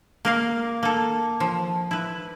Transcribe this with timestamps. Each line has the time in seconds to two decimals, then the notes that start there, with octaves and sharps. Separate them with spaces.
0.25 A#3 A#4 F5
0.83 A#3 A4
1.40 F3
1.91 E4 B4